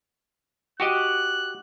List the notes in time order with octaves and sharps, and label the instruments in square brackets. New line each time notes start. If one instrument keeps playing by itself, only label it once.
[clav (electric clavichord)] F#4 G4 D#5 [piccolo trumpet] F#6